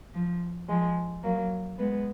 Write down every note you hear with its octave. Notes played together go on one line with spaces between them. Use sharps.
F3
F3 G#3
F#3 A#3
G#3 B3